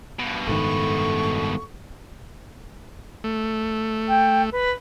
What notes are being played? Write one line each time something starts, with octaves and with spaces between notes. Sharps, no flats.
G2 B2
F#1 G#2 D#3 A3 C#6
A3
G5
B4